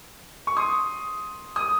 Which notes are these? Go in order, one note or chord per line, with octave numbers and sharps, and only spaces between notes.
C#6
C6 D#6
D#6